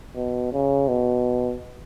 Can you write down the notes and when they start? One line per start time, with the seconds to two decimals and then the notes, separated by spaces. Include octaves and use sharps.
0.16 B2
0.52 C#3
0.88 B2